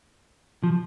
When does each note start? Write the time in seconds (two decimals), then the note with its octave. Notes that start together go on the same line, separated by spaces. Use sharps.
0.63 F3